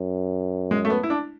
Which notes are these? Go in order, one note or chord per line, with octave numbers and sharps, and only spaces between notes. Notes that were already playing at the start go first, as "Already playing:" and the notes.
Already playing: F#2
G#3
A3
B3
E4
D4